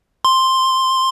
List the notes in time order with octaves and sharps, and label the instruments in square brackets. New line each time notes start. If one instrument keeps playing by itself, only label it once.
[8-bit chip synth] C6